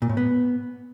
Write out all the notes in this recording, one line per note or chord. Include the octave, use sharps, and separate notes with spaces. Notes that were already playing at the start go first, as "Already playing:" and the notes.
A#2
A2
B3